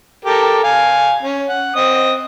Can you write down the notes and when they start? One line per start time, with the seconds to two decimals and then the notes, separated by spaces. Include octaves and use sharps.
0.25 G4 A4 A#4
0.64 F5 G#5
1.22 C#4
1.49 F#5
1.76 C4 D#5 D#6